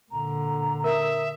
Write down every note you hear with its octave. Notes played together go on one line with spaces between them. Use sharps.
A#2 D3 A#5
A#4 E5 D#6